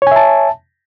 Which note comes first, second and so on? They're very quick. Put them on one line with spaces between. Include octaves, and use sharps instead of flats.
C#5 G#5 E5 A5